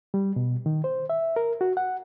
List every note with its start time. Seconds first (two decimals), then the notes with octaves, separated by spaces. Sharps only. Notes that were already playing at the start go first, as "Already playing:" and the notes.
0.14 G3
0.36 B2
0.66 D#3
0.84 C5
1.10 E5
1.36 A#4
1.61 F#4
1.77 F#5